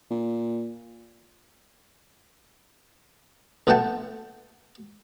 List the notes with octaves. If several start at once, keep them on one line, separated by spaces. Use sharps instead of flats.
A#2
A#1 B2 A3 F#5 G5 A5